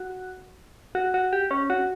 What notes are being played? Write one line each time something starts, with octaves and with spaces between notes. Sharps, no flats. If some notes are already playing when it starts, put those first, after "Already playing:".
Already playing: F#4
F#4
F#4
G4
C#4
F#4